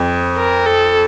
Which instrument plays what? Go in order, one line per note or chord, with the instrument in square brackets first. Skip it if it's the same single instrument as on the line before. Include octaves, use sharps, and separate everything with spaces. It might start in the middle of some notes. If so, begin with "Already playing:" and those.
Already playing: [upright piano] F2
[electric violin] A#4
A4